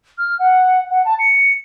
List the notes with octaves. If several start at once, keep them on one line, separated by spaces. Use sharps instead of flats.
F6
F#5
F#5
A5
C#7